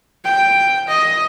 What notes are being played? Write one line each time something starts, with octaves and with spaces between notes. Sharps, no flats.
G5
D#5